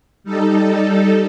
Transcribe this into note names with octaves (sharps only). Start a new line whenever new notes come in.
G3 D#4 A4